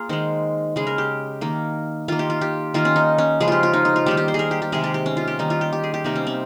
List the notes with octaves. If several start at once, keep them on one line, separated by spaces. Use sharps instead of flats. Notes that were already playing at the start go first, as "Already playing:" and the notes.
Already playing: A#3 F4 G#4 A#4
D#3 G#3 C5
C#3 G#3 G#4
A#4
G4
D#3 A#3
D#3 A#3 F4
G4
F4
G4
D#3 A#3 F4
C#4
D#4
C#4
C#3 F3 G#3 G#4
F4 G4
F4
D#4
D#4
F4
D#3 G3 A#3 G4
G4
C5
G#4 A#4
G4
G4
C3 D#3 G#3 G#4
G4
G4
C#4
F4
G4
D#3 G3 A#3 D#4
F4
G4
G4
G#4
G4
C3 G3 A#3 D#4
C#4
C4